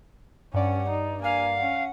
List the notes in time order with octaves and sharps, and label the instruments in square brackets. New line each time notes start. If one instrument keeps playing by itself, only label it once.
[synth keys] G2 D5 [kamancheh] C#4 F#5
[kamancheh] D#4
[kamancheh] A#3 G#5 [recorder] F5
[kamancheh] C#4 F#5